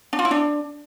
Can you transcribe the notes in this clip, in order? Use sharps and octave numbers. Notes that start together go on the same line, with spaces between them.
D4
F4
E4
D4